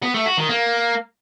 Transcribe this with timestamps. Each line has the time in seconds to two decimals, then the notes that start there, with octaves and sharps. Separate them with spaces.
0.02 B3
0.14 A3
0.26 F#4
0.37 D#3
0.49 A#3